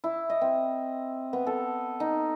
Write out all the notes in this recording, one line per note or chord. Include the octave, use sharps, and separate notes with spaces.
E4
D#5
C4
B3
A4
D#4